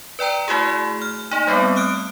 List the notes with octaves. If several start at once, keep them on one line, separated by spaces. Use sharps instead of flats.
B4 D5 G5 A#5
A3 E4 F#4 G#4
F6
A#3 D#4
G3 A3 B3 C4
D#6 F6 F#6 D7